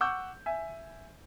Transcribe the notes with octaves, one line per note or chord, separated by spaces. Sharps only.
F#5 C#6 D6 E6 G6
E5 G#5